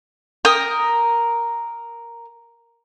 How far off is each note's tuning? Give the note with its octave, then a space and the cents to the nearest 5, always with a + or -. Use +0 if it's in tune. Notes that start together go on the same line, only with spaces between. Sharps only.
A#4 +0 G5 +25 D#6 +0